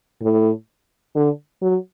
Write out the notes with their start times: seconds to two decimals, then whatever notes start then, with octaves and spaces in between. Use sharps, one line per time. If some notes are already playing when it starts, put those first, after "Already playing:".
0.22 A2
1.15 D3
1.62 F#3